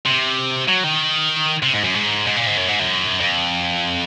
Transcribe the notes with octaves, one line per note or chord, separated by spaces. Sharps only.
C3
F#3
D#3
C3
G#2
F#2
G#2
G#2
A#2
G#2
F#2
G#2
F#2
F2